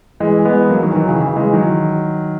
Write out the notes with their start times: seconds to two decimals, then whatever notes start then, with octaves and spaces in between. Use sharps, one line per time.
0.20 E3 G#3
0.45 G#3 B3
0.70 F#3 A#3
0.83 D#3 F#3
0.90 E3
0.94 D#3 F#3
1.08 C#3 E3
1.20 C#3 E3
1.36 E3 G#3
1.53 D#3 F#3